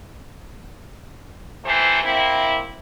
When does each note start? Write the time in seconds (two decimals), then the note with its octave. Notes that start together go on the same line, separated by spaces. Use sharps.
1.65 C3 E3 A3 C5
2.03 A#3 C4 E4